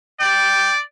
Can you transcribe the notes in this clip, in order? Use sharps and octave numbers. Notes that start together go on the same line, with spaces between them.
D5 G5